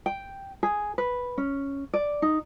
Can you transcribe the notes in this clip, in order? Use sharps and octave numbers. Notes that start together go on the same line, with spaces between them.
G5
G#4
B4
C#4
D5
D#4